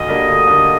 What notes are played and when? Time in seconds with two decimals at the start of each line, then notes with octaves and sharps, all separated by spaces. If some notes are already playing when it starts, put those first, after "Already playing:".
Already playing: D2 D#5
0.08 D3 G3 A#3
0.28 D2
0.47 D3 G3 A#3